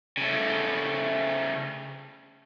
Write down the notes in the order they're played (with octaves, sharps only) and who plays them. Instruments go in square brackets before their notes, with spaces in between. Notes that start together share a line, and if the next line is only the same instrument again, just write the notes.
[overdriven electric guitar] C#3 A3